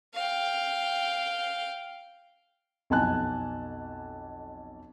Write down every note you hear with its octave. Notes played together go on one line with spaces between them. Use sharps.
F5 G5
B1 F2 G#5 A5 F#6